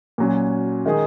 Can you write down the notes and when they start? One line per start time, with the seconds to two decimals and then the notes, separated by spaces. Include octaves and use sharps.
0.18 A#2 F#3 C#4
0.86 D#3 G#3 D#4 G#4